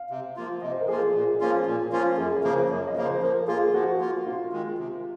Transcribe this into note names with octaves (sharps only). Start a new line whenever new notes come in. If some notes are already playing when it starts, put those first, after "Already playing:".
Already playing: F5
C3
F3 A#3 F4
C3 D#5
C5
A#4
F3 A#3 F4 G#4
A#2
F3 A#3 C#4 F4
A#2
F3 A#3 C#4 F4
F#2 G#4
C#3 F3 A#3 A#4
F#2 C#5
D#5
C#3 F3 A#3
C5
F3 A#4
A#3 F4 G#4
F3 F#4
A#3 F4
C3 F4
D#3 G#3
C3